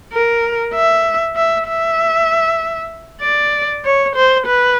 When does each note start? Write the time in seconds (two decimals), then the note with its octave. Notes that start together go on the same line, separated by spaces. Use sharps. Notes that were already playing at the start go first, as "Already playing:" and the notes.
0.13 A#4
0.74 E5
1.36 E5
1.68 E5
3.22 D5
3.85 C#5
4.15 C5
4.46 B4